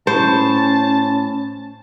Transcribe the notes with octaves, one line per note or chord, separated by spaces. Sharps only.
A2 C#4 C5 A5